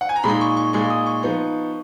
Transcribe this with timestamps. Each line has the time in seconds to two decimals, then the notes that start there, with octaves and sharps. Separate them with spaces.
0.01 F#5
0.09 G#5
0.16 A#5
0.23 A#2 G#3 D#4 B5
0.41 C#6
0.57 C#6
0.73 A#2 G#3 D#4 C#6
0.90 D#6
1.06 C#6
1.23 F3 B3 D#4